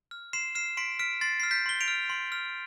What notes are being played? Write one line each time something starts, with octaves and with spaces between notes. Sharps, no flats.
F6
C6 C7 E7
F6 C7 E7
C6 B6 D7
F6 B6 D7
C6 A6 C7
F6 C7
G6 B6
C6 G7
D7 F7
F6
C6
F6